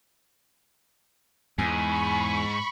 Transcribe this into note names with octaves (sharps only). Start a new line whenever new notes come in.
E2 G#2 G#5 B5 C#6